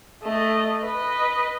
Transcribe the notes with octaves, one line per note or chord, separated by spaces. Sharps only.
A3 D#5
B4 D#5